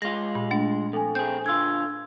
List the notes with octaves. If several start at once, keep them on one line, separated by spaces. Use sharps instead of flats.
G#3 F4 A#6
A#2
A3 D4
F2 A4 G#5
C4 G#4 G6
D3 F4 E6 G#6